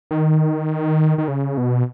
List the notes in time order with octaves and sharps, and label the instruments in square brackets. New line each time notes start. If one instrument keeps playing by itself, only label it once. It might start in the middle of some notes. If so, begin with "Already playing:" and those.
[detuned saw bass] D#3
D#3
C#3
B2